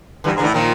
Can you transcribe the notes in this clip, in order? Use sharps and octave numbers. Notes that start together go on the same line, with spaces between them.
G2 D3 E3
G#2
D3 E3
A2
A#2 D#3 F3